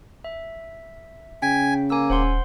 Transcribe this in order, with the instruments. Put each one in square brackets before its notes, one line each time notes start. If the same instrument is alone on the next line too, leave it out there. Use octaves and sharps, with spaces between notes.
[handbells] E5
[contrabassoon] C#3 [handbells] G5 B6 [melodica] G#5
[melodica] A#3 [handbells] G#5 E6
[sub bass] D#1 [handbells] C5 F#5 C6